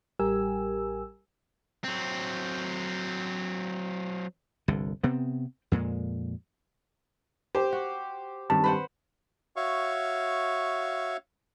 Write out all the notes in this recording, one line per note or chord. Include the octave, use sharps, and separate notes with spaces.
A1 G3 G4 A#4 G#5 E6
F#3 C4
G1 C2 D3
C3 B3 C4
F2 A#2 G#3
G4 C5
F#4
G2 D#3 G3 C4 A5
B4 C5 F#5 B5
F#4 C#5 E5 F5 C#6